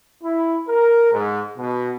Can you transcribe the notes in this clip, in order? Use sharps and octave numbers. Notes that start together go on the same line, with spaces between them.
E4
A#4
G#2
B2